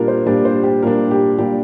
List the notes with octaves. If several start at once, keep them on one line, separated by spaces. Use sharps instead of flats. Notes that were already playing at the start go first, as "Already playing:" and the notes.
Already playing: A#2 G3 D4 F4 A#4
C5
A#2 G3 D4
C5
G4
A#2 G3 D4 A#4
G4
A#2 G3 D4 G4